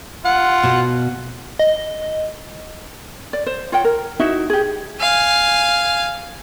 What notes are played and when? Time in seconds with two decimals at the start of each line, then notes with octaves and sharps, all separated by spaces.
0.25 F4 F#5
0.63 B2
1.59 D#5
3.33 D5
3.46 C5
3.72 F4 C#5 F#5 G5
3.84 A#4
4.20 D#4 E4 F#4 E5
4.50 G4 G#4
5.01 F5 G#5